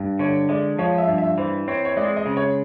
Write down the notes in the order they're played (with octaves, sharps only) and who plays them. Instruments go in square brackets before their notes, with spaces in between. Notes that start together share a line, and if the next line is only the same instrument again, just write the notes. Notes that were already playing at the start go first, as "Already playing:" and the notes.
Already playing: [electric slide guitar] G2
[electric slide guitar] D3 [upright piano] C#5
[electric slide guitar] G#3 [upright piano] D5
[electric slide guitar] F3 [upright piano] C#5
[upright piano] E5
[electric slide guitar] G2
[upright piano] E5
[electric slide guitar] E3 [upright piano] C5
[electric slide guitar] C4 [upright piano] C#5
[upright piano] C#5
[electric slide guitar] G#3 [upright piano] D5
[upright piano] D#5
[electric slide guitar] C#3
[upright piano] C#5